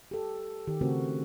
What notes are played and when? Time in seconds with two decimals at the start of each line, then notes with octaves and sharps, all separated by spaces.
0.11 G4 A4
0.67 D#3 G4
0.81 C#3 A3 C4 F#4 A#4